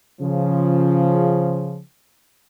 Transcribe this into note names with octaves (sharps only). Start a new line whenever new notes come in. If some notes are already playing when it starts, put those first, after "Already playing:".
C#3 F3